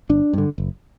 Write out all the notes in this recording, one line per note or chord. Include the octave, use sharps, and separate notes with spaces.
G1 D4
G2 D3
F#1